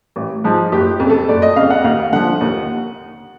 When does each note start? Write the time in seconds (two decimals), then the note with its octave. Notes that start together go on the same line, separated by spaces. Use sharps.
0.16 A1
0.44 G#2 F3
0.72 F#1 G4
1.00 F2 C#3
1.09 A4
1.28 F#1 D5
1.42 D#5
1.56 F2 C#3 F5
1.70 F#5
1.84 D#2 F5
2.12 D3 F3 F#5
2.41 D#2